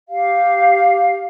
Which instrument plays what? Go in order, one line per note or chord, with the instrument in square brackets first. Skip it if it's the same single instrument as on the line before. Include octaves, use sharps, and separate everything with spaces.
[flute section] G4 F5